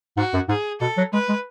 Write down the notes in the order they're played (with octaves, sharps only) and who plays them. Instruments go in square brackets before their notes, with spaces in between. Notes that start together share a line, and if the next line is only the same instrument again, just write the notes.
[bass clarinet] G#2 [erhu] F#4
[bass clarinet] F#2
[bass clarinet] G#2 [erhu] G#4
[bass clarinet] B2 [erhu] A4
[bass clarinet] F#3
[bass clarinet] G#3 [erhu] B4
[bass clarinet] G#3